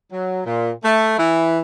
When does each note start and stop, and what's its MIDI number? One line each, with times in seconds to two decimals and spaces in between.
0.12 0.39 54
0.45 0.70 46
0.83 1.17 57
1.18 1.59 52
1.18 1.59 64